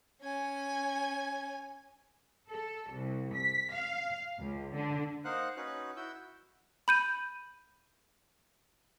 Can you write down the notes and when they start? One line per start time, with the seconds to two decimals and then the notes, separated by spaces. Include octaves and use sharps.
0.22 C#4 G#5
2.48 A4
2.92 C2
3.35 B6
3.74 F5
4.39 C#2
4.73 D3
5.25 A#3 D#4 C5 F5 F#5 F#6
5.57 C#4 D#4 F#4 B4 F#6
5.97 E4 F#4 E6 G6
6.88 B5 G6 D#7